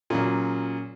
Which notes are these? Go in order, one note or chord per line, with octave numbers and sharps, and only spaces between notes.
A#2 C#3 F#3